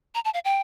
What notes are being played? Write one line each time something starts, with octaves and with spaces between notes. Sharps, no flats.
A#5
A5
F5
G5